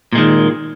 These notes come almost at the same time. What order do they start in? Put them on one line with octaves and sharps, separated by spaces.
A#2 G#3 D#3